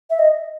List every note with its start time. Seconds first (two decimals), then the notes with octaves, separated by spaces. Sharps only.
0.10 E5
0.19 D#5